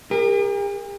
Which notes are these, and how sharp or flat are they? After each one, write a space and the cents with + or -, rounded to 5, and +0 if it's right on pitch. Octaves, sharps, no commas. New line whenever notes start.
G4 +45 A#4 +0